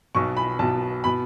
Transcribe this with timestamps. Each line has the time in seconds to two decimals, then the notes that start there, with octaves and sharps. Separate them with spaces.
0.15 B1 B2 C#6
0.37 B5
0.59 B1 B2 A5
1.04 B2 B5